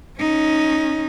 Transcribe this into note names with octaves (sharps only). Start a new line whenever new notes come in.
C#4 D#4